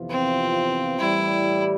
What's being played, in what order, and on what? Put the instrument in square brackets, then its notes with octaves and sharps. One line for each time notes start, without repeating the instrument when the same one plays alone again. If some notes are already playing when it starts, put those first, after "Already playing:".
Already playing: [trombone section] F2 C3 E3 B3 F4
[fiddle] C4
[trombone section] A2 E3 G3 [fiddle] E4